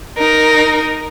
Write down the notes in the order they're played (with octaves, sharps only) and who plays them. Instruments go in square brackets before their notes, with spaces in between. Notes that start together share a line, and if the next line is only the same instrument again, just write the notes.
[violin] D#4 A#4